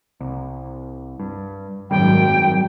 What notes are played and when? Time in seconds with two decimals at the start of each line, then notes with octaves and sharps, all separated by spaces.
0.20 C2
1.20 G2
1.91 G#1 F#2 D#3 G3 G5